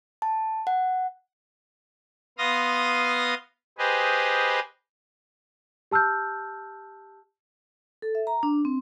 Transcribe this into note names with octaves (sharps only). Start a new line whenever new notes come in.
A5
F#5
B3 F5 C6 D#6 F6 A#6
G4 G#4 B4 C5 D#5
G4 A5 E6 F6 G6
A4
E5
A#5
D4
C4